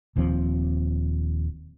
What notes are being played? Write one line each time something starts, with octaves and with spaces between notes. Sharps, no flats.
D#1 D#2 F3 C4